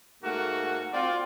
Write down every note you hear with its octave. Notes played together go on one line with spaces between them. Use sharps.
G#2 A3 A#3 F#4
C4 F4 D5